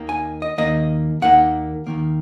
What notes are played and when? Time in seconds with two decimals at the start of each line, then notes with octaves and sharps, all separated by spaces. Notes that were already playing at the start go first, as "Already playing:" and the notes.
Already playing: D#2 D#3 A#3
0.09 G#5
0.42 D#5
0.58 D#2 D#3 A#3 D#5
1.22 D#2 D#3 A#3 F#5
1.87 D#2 D#3 A#3